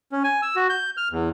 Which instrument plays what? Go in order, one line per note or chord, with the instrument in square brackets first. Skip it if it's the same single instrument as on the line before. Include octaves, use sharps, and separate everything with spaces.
[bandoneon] C#4
G#5
E6
F#4
G6
F6
E2